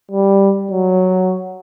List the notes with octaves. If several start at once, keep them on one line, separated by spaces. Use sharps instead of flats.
G3
F#3